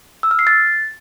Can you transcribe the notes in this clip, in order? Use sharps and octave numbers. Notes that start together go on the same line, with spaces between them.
E6
F6
C7
A6